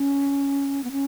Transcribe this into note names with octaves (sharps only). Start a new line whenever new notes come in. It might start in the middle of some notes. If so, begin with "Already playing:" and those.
Already playing: C#4
B3
C#4